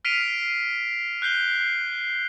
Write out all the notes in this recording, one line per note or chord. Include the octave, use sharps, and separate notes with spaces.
F6 B6 C7 D7 D#7 F7
F#6 G6 C7 G7